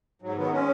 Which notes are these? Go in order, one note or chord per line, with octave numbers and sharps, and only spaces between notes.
G#2 F#3
D#3 F#3 B3
G#3 C#4